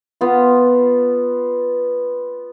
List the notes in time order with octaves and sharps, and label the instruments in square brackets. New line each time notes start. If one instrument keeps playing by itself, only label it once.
[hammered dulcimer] B3 F4